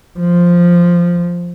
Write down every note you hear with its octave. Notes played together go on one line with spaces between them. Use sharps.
F3